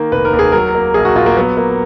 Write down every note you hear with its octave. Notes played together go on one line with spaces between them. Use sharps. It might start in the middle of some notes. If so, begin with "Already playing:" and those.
Already playing: D#3 A#3
F1 B4
A#4
D#2
G#4
F#3 A#4
A#3
A#1 G#4
F#4
A#2 F4
A#3
F#3 B3
A#3